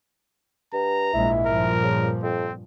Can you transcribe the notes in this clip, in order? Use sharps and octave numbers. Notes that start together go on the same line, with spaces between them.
G2 A#5
A#1 G#2 G#3 E4
G2 A#2 F3 A#4
C#3
F2 C4